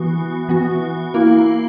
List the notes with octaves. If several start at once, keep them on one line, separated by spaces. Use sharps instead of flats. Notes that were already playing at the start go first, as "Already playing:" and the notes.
Already playing: E3 B3 F#4
E3 B3 F#4
A#3 E4 A#4